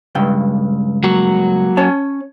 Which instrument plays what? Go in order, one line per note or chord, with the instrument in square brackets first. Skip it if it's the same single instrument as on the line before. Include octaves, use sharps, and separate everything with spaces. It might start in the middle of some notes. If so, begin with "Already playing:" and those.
[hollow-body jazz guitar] C#2 G2 G5
[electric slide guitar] F#3 A#3 F#4
[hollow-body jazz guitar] C#4 C#5 A5